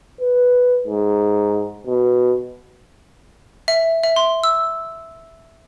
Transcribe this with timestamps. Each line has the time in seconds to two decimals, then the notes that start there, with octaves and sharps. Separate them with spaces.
0.20 B4
0.87 G#2
1.87 B2
3.68 E5
4.03 E5
4.16 C6
4.44 E6